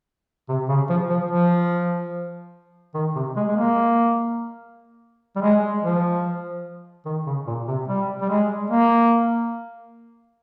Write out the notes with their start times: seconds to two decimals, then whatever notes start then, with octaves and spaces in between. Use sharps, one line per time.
0.49 C3
0.68 C#3
0.89 F3
1.10 F3
1.31 F3
2.94 D#3
3.15 C3
3.36 G#3
3.48 G#3
3.56 A#3
5.36 G3
5.41 G#3
5.83 F3
7.05 D#3
7.26 C#3
7.47 A#2
7.68 C3
7.88 G3
8.21 G3
8.29 G#3
8.70 A#3